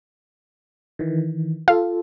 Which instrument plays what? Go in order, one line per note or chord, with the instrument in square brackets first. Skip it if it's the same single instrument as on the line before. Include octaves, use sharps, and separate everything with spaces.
[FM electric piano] D#3 E3
[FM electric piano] F4 A4 [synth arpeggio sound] F5